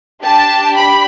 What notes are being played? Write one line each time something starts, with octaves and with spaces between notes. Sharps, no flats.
D4 G4 A5
B5